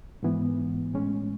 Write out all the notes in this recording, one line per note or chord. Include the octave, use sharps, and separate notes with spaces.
G#2 E3 B3
A2 G#3 C#4